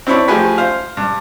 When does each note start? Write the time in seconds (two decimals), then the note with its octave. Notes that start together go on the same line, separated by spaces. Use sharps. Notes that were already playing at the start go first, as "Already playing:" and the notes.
0.07 C4 D4 E4 C#5 B5
0.28 F3 A3 G4 G#4 B4
0.58 C5 F5
0.97 G2